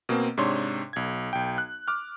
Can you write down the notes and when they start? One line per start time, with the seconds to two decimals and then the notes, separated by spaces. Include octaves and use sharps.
0.09 B2 A#3 C4
0.37 G#2 C3 D4 C#5 C6
0.93 B1 G#6
1.33 B1 G5
1.58 F#6
1.88 D6 F6